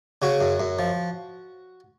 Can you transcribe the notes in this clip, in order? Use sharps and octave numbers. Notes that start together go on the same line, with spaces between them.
C#3 F#4
F#2
F#2
F3